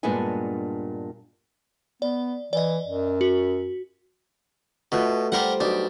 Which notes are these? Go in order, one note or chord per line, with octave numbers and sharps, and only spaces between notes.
G2 A#2 G#3 B3 D4 G#5
B3 D5
E3 D5 D#5
F#2
F#4
B2 A3 F4 B4
G3 G4 A#4 C5 D5 F#5
B1 D4 G4